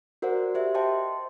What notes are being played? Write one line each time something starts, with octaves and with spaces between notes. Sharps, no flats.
F#4 A#4 C5 D5 F#5
G4 C5 E5
C5 D#5 E5 G5 A5 C6